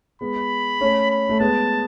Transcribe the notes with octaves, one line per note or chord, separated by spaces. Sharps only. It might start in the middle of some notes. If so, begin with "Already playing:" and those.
G#3 B3 B5
A3 C#4
B5
A3
G#3 B3 A5